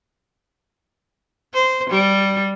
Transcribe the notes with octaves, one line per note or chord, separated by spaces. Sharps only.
C5
G3